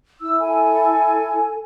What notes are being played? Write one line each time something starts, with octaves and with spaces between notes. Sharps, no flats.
E4 E6
A4 G#5